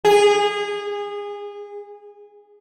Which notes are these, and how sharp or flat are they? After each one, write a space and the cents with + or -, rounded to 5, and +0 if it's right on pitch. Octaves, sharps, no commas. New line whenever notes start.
G#4 -25